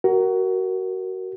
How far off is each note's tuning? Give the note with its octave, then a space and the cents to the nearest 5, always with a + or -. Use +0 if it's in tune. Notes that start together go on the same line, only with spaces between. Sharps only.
F#4 +25 A#4 +0